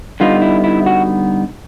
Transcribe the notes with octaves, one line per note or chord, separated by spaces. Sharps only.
D3 G3 B3 D#4 F4
E4
E4
F#4